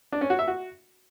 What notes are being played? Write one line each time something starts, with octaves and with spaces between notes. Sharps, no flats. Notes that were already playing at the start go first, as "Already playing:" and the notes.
D4
C#4
F#4
E5
F#4